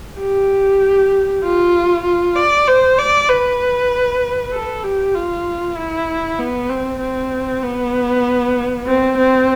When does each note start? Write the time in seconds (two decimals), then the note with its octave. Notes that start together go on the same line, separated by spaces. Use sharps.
0.19 G4
1.43 F4
2.05 F4
2.36 D5
2.68 C5
2.99 D5
3.29 B4
4.52 A4
4.84 G4
5.15 F4
5.77 E4
6.39 B3
6.70 C4
7.00 C4
7.63 B3
8.87 C4
9.17 C4